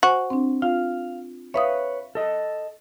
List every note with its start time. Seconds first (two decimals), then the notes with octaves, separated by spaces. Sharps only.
0.03 F#4 C5 G#5
0.30 C4 D4
0.62 F4 F5
1.54 B4 C#5 E5 F5 D#6
2.15 A4 D#5